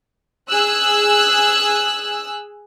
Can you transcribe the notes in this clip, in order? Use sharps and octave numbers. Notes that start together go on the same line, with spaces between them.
G#4 E6 F#6